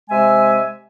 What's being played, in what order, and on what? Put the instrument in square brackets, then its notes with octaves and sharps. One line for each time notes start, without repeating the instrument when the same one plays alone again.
[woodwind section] C3 G#3 E5 G#5